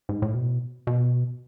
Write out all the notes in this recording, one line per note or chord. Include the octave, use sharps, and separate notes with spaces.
G#2
A2
B2
B2